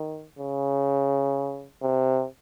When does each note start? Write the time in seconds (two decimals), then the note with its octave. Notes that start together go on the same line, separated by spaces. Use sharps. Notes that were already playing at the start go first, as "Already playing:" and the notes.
Already playing: D#3
0.39 C#3
1.83 C3